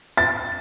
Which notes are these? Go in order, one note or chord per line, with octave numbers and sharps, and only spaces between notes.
A6